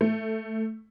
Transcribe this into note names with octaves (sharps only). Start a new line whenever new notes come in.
A3